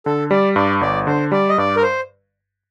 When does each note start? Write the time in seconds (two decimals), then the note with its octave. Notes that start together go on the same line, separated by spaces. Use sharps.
0.06 D3 A4
0.31 G3 D5
0.56 G2 D5
0.81 G1 D5
1.07 D3 C5
1.32 G3 D5
1.49 D#5
1.58 G2 D5
1.76 A#4
1.83 C5